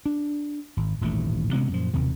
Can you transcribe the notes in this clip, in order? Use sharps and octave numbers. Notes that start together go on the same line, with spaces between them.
D4
G#1
D#1 A1 G#2 A3
C3 G#3 B3 C#4
F#2 A#2 F3
E1 D#2 C3 D#3